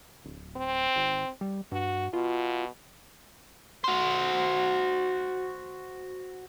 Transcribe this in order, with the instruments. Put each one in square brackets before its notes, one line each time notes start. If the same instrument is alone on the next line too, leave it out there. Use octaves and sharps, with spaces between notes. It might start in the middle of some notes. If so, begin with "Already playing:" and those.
[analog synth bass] D1
[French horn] C4
[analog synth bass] G#1
G3
[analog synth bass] G2 [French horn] F#4
[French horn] B2 [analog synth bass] F4
[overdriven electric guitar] F#4 C5